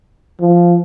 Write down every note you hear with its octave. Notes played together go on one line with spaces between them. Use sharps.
F3